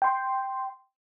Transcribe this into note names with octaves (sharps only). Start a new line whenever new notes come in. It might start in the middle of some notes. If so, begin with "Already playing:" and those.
G5 C6